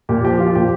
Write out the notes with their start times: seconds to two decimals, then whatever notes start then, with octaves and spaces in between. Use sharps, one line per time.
0.09 A#2 G4
0.25 F3 G4
0.40 F3 F4
0.55 A#2 G4